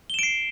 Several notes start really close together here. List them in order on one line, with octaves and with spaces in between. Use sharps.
G7 E7 D7 C7